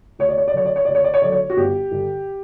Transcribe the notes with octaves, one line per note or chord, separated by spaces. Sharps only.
D2 C#5
D5
C#5
D5
D3 F#3 A3 C#5
D5
C#5
D2 D5
C#5
D5
C#5
D3 F#3 A3 D5
C#5
F#4
G1 G4
G2 D3